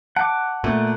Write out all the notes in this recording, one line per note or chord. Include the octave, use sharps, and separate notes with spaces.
F#5 A5 D6
A#2 A3